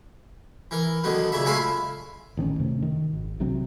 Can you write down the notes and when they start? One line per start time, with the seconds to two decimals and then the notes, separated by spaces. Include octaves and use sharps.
0.71 E3 A#4
1.04 D3 D#3 F#3 B3
1.32 A#2 C#3 E5
1.46 G#3 A3 C#4 B4 E5 F5
2.37 A1 D#3 A3 C#4
2.59 F#2 C3 A3
2.82 D#3
3.13 G#1
3.40 B1 C3 F#3 C4